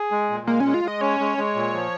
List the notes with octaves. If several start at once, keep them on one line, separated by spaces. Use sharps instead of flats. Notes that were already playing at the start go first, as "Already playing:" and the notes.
Already playing: G#4
G#3
A#2
G#3 A#3
C#4
G#3
F4
G#3 D#5
C#4 C#5
G#3
G#3
A#2
F3